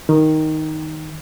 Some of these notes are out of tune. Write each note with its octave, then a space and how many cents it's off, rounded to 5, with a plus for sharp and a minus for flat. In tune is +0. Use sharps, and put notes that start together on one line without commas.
D#3 +5 D#4 +0